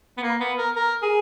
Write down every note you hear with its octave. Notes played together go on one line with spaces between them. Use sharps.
B3
A#3
B3
A#4
A#4
G#4